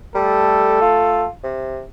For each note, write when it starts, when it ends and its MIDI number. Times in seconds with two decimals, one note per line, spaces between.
0.15 0.77 55
0.15 1.26 57
0.15 1.26 69
0.81 1.29 65
1.43 1.82 48